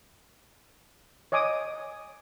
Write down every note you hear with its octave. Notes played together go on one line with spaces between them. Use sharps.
C#5 D#5 G#5 D6 D#6